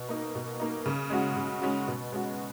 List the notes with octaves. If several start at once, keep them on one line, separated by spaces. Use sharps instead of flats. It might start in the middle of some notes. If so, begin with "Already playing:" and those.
Already playing: B2
A#3 D#4
B2
A#3 D#4
C#3
G#3 C#4 F#4
C#3
G#3 C#4 F#4
B2
G#3 C#4 F#4